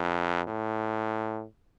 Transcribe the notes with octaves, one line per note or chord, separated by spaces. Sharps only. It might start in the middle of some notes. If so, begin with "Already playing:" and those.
Already playing: F2
A2